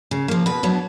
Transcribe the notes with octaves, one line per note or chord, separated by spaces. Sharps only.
C#3
F3 A#3
B2 B4
F#3 B3 D4